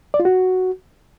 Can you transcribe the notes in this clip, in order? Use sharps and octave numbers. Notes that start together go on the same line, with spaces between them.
D5
F4
F#4